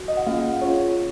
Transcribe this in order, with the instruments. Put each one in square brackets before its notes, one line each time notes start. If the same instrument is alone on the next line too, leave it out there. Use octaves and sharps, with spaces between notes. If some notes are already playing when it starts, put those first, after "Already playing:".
Already playing: [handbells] F#4
D#5
F#5
A#3 C#4 F4 G#4 F5
C#4 F4 G#4 C#5